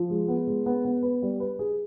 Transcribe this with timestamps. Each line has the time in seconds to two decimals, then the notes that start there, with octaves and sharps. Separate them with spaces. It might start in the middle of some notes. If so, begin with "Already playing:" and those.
Already playing: F3
0.10 G#3
0.28 B3
0.47 G#3
0.66 B3
0.85 B3
1.03 B4
1.22 G3
1.40 B4
1.59 G#4